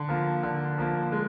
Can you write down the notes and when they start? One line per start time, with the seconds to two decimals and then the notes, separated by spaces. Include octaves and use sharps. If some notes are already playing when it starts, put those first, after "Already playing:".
Already playing: D3
0.09 F3 A#3
0.43 D3
0.78 F3 A#3
1.12 G#3